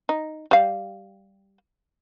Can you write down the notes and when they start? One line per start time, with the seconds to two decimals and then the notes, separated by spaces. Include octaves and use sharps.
0.09 D#4
0.51 G3 F5